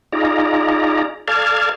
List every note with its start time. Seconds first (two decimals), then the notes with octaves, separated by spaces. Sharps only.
0.12 D#4 F4 G#4 D5 A#5
1.28 A4 D5 F5 A5 F6 G#6